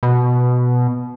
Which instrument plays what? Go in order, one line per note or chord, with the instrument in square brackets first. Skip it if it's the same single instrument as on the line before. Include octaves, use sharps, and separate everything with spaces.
[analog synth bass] B2